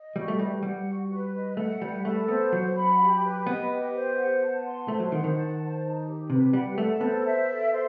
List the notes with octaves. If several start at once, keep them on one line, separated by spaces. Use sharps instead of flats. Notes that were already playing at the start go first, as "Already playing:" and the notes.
Already playing: D#5
G3 F#4
A3
G3 B4
G3 F#5
F#4
B4
D#5
A3 F#5
G3 B4
A3 A4
B3 C5
F#3 F#5
B5
G4
B4
B3 D#5
G4
C5
F#5
A5
C6
A3 C5
F#3
D#3 F#5
D#3
A5
C5
D#4
G4
C3 B4
G3 F#5
A3 A4
B3 C5
E5
A4
C5